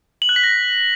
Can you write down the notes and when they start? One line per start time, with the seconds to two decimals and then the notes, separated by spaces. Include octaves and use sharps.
0.22 F#7
0.29 F#6
0.36 B6
0.43 A#6